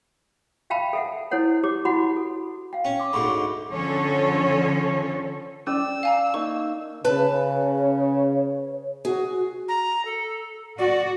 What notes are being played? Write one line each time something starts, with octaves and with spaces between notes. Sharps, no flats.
E5 F5 G5 A5 B5
A4 E5 F#5
E4 A4 C5 C#5 F#5
G4 C#5 D6
E4 F#4 F#5 B5
A4
F5 G5
C#4
C6 D6
D2 G#2 D3 B5 C#6 D6
D3 F3 C#4 A4 C#5
C#4 D5 E6
F5 G#5 A#5
A#3 D#4 C#6
C#3 B4 C#5 A5
F#4 G#4
A#5
A4
F#4 D5